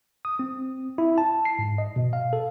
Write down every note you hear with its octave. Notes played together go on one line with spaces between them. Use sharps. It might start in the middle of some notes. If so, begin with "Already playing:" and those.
D#6
C4
E4
A5
C7
G#2
D#5
B2
F5
A4